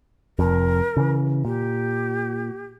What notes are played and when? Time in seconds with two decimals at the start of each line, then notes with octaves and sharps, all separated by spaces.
0.39 F1 F2 A#4
0.97 C#3 E3
1.45 A#2 G4